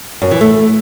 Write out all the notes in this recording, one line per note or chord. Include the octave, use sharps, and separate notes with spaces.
F#2
E3
A3